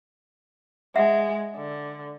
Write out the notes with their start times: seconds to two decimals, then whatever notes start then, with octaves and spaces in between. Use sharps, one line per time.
0.96 G#3 E5 F#5
1.56 D3